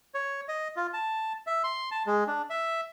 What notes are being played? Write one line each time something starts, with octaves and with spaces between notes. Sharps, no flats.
C#5
D#5
F4
A5
E5
C6
A5
G#3
D4
E5